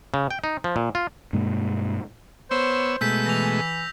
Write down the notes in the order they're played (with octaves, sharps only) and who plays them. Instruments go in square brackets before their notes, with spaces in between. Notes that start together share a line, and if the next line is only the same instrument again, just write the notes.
[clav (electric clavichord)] C#3
G5
D#4
F3
A#2
F4
[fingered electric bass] G2 B2 G#3 A#3
[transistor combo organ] B3 C#5 E6 [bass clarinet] C5
[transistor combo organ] B2 G#3 A3 [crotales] E6 G6 B6
[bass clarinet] E3 [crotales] A#6 F7